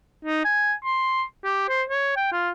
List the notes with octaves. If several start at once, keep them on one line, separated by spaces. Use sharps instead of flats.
D#4
G#5
C6
G4
C5
C#5
G5
F4